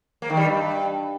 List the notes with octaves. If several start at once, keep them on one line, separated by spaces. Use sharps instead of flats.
A#3
D#3
G3
G2